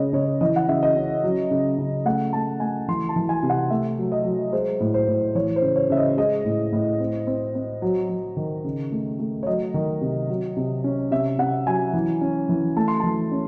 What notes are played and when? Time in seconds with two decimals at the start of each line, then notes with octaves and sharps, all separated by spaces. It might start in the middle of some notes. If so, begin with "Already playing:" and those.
Already playing: C#3 G#3 C#5 D#5
0.13 C#3 C#5
0.41 E3 D#5
0.56 F#5
0.68 C#3 E5
0.83 D#5
0.97 C#4
1.23 F#3
1.51 C#3
1.78 C#3
2.05 A3 F#5
2.33 A3 A5
2.60 A3 G#5
2.88 E3 C6
3.09 A5
3.16 E3
3.29 G#5
3.43 C3
3.50 F#5
3.70 A3 E5
3.98 F#3
4.12 D#5
4.25 F#3
4.53 G#3 C5
4.80 A2
4.94 C5
5.08 A2
5.35 E3 C#5
5.56 C5
5.62 C#3
5.76 C#5
5.90 C#3 E5
5.97 D#5
6.17 G#3 D#5
6.45 A2
6.72 A2
7.00 C4
7.27 C4
7.55 C4
7.82 F#3
8.09 F#3
8.37 D#3
8.64 C#3
8.92 A3
9.19 A3
9.43 C#5
9.47 F#3 D#5
9.74 D#3
10.01 C3
10.29 F#3
10.57 C3
10.84 C#4
11.11 C3 E5
11.38 C3 F#5
11.66 F#3 G#5
11.94 E3
12.21 C#4
12.49 E3
12.77 A3 A5
12.88 C6
13.00 E3 A5
13.32 C#4